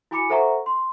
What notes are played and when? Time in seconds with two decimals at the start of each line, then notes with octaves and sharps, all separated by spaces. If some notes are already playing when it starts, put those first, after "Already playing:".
0.11 E4 F#4 G#5 B5 D6 C#7
0.30 A4 C5 E5 F#5 A#5 C#6
0.66 C6